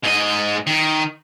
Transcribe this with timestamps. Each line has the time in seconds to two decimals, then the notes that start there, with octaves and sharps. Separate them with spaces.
0.03 G#2 D#5
0.67 D#3